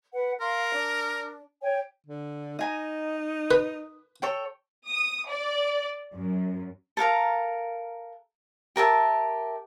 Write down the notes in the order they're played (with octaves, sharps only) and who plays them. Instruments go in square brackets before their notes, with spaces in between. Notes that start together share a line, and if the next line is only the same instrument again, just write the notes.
[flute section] B4 F#5
[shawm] A#4 [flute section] F5 C6
[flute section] D4
C#5 G5 G#5
[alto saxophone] D3
[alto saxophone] D#4 [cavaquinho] D#5 G#5 A#5
[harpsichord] B4 [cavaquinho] D#6
[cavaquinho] A4 C#5 G5
[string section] D#6
D5
F#2
[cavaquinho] A4 A#4 F5 A#5
G4 A#4 E5 A5